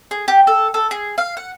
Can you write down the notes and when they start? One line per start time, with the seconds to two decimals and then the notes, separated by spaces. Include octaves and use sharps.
0.11 G#4
0.28 G4
0.47 A4
0.74 A4
0.91 G#4
1.18 F5
1.37 F#5